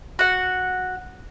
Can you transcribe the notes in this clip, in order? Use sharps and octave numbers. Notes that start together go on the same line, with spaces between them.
F#4 F#5